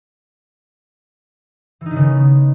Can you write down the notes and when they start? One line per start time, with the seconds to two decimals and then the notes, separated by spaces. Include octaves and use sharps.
1.81 E3
1.86 D#4
1.91 D#3
1.96 C#3
2.01 B3